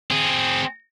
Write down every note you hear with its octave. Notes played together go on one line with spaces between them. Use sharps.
C4 G#4